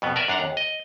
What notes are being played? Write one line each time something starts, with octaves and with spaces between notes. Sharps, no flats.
F2 B2 B3
A#4 B4 D5 E5
F#2 D4 F5 F#5 A#5
D#2
D#5